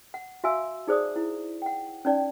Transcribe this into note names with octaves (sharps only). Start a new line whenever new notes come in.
F#5
F#4 E5 F5 G#5 E6
D#4 G#4 C5 D5 D#6
E4
F#5 G5
C#4 D#4 D5 G5